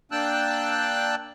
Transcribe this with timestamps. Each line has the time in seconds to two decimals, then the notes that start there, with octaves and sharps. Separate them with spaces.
0.12 A#3 D4 G5 A5 E6 F#6